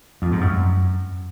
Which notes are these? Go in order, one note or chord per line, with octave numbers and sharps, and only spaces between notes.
F2
G#2
F#2